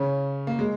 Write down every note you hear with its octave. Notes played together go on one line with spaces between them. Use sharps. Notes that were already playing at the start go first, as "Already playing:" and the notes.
Already playing: C#3 C#4
A#3
G#3